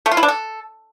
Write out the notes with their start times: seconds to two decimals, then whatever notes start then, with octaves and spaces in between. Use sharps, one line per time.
0.06 A3
0.11 F4
0.17 E4
0.23 D4
0.28 A4